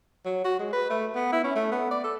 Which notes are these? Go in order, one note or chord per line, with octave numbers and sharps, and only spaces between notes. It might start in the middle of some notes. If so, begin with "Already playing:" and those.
F#3
F#4
G#3
B4
A3
B3
E4
C#4
A3
B3
D5
A4